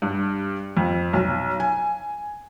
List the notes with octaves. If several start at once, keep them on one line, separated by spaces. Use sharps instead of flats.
G2
F2
B1
G#5